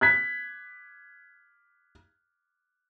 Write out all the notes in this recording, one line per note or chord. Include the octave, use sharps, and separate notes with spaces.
F#6 G#6 B6